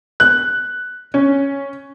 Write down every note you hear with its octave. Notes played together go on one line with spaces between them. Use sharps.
F#6
C#4